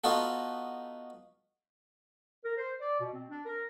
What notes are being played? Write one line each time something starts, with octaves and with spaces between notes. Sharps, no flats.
B3 D#4 F4 F#4 A4
A#4
C5
D5
B2
C4
D4
A#4